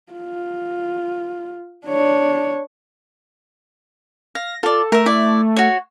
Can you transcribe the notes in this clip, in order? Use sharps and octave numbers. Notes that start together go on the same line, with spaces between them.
F4
D4 C#5
F5 A#6
F4 A4 D5
A3 A#4 E5
E4 D5
F#4 C#5